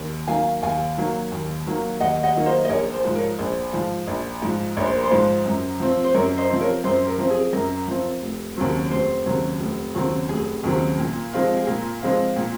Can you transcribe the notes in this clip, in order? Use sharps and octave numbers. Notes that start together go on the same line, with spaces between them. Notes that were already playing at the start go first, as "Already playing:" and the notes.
Already playing: D#2
D#3 F#3 A#3 F5 G#5
D#2 F5 G#5
D#3 F#3 A#3
D#2
D#3 F#3 A#3
D#2 D#5 F#5
D#5 F#5
D#3 F#3 A#3
C5 D#5
D#5
A#1 A#4 C#5
C5
G#2 F3
A#4 C#5
A#1 C5
G#2 F3
A#1
G#2 F3
A#1 C#5
C5
A#4
C5
G#2 F3
F#2
F3 C4
C5
F#2 A#4 C#5
C5 D#5
F3 C4
A#4 C#5
F#2 C5
A#4
F3 C4
G#4
F#2 A#4
F3 C4
F1
D#2 C#3 F#3 C4
F1 C5
D#2 C#3 F#3 C4
F1
D#2 C#3 F#3 C4
F1 G#4
D#2 C#3 F#3 C4
A#2
F3 G#3 C4 F4
G#4
A#2 A#4
F3 G#3 C4 F4
A#2